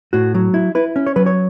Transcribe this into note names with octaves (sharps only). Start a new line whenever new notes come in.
A2 F#4
F#3
E4
E4 B4
C#4
C#5
F#3 B4
C#5